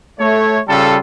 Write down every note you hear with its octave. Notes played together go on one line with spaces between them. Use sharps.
A3 C#5
C#3 G3 F4 A4